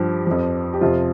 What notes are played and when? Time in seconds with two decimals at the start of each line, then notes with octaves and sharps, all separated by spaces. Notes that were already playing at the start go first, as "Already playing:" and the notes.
Already playing: G2 F3 G4
0.26 F2 F3
0.74 G4
0.81 F2 C3 F3 F4